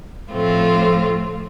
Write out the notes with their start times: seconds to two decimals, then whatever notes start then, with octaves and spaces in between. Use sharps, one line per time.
0.32 A2 F3 A3 C4 F4